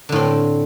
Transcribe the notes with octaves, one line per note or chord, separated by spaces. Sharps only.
A2 D3 C4